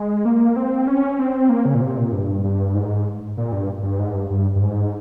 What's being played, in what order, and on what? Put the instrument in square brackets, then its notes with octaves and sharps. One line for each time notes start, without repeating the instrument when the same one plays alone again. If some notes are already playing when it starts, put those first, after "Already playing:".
Already playing: [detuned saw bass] G#3
A#3
C4
C#4
C4
A#3
C#3
A#2
C3
A#2
G2
G2
G#2
A#2
G2
G2
G#2
G2
G2
G2
G#2